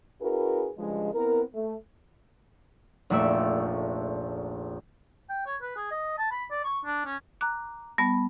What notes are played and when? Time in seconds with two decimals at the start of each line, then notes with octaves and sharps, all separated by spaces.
0.21 C#4 E4 F#4 G#4 A#4 B4
0.77 G2 C#3 F3 G#3
1.14 B3 C4 E4 A#4
1.54 A3
3.10 F1 A#1 A3 D5 E5
5.30 G5
5.46 C#5
5.62 B4
5.76 G#4
5.91 D#5
6.18 A5
6.31 B5
6.51 D5
6.64 C#6
6.85 D4
7.05 C#4
7.41 A#5 D6 F#6
7.98 G3 B3 A5 B5